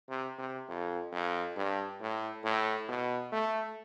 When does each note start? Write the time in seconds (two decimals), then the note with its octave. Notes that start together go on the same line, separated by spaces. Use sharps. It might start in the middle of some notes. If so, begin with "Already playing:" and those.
0.09 C3
0.39 C3
0.68 F2
1.12 F2
1.57 G2
2.00 A2
2.44 A2
2.88 B2
3.32 A3